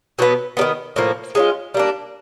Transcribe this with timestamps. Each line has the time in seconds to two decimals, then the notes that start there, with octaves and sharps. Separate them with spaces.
0.19 B2 F#3 B3
0.57 G3 B3
0.61 D#3
0.96 A2 F3 A#3
1.35 G#3 C#4 F4
1.74 G3 A#3 D4